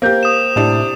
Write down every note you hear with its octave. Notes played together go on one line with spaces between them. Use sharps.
A#3 G4 C5 G6
D#6 E7
A2 C3 D4 E4